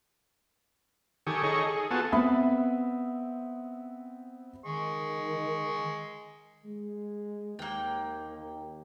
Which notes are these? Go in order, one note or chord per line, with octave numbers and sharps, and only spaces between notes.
D#3 G4 A4 G#5 C#6 D#6
D#4 G#4 A4 C#5 D#5 C#6
G#4
B3 F4 F#4 A4 G#5 A5
B3 C4 E5 B5 D#6
D#3 G#3 C#6
G#3
D#2 A#3 G5